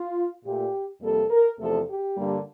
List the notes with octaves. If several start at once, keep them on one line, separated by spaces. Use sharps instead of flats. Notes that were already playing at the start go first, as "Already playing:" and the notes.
Already playing: F4
A#2 A3 G4
F2 C3 G3 A#3 A4
A#4
E2 C3 F3 A3 A4
G4
G2 D3 G3 A#3